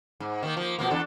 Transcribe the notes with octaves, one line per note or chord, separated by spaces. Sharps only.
G#2
D#3 A#3
F3 A#3
B2 F3 A#3
E2 D4 A4